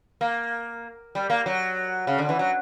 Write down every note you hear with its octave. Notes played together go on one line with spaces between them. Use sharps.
A#3
G3
A#3
F#3
C#3
D3
E3
F#3